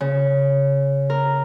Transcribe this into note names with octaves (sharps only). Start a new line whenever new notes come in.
C#3
A#4